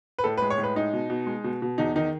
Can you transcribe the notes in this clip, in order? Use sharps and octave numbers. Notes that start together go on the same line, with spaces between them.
B4
A2 A4
B4
G#3
C#5
A2
B4
G#3 D#4
B2
B2
G#3
B2
B2
E2 D#4
D#3 D#4